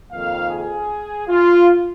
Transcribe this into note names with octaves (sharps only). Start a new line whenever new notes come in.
F2 D#3 A#3 F5
G#4
F4